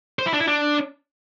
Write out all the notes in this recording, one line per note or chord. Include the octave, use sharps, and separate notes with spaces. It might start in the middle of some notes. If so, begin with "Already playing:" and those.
C5
E4
D4
E4
D4